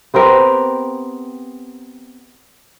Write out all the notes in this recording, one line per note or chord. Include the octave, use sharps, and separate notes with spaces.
B3 C4 G4 A#4